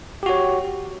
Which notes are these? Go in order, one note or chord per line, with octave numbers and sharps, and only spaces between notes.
F#4 G4 C#5